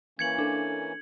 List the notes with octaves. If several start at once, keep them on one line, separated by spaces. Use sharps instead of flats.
E3 A#3 C#4 G#6 C#7 F#7
D4 A4